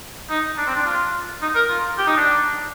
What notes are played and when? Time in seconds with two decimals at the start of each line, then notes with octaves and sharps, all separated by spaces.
0.30 D#4
0.57 D4
0.66 C4
0.76 D4
0.85 F4
1.42 D#4
1.55 A#4
1.69 F4
1.98 G4
2.07 D#4
2.17 D4